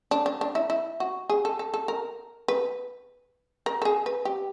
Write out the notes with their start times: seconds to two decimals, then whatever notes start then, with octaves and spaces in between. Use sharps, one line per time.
0.11 D4
0.26 D4
0.41 D4
0.55 E4
0.70 E4
1.00 F#4
1.30 G#4
1.45 A4
1.59 A4
1.74 A4
1.88 A#4
2.48 B4
3.66 A#4
3.82 A4
3.85 G#4
4.06 B4
4.25 G4